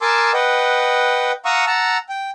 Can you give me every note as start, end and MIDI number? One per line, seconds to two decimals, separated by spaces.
0.01 0.32 70
0.01 0.32 80
0.01 0.32 81
0.01 0.32 84
0.01 0.32 86
0.01 0.32 88
0.34 1.32 71
0.34 1.32 75
0.34 1.32 78
0.34 1.32 79
1.45 1.65 77
1.45 1.65 78
1.45 1.65 82
1.45 1.65 85
1.45 1.65 87
1.45 1.65 88
1.66 1.98 78
1.66 1.98 81
1.66 1.98 82
1.66 1.98 88
2.09 2.30 79